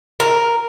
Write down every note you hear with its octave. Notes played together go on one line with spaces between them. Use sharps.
A#4